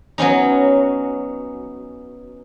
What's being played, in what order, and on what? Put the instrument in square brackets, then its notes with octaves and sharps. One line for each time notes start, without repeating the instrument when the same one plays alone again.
[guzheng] F#3 B3 C#4 D#4